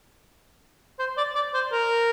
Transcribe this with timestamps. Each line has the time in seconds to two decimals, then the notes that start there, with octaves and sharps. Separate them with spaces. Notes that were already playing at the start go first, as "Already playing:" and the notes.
0.99 C5
1.17 D5
1.35 D5
1.54 C5
1.72 A#4